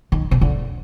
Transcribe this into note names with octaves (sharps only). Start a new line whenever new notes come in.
D#3
C3
D3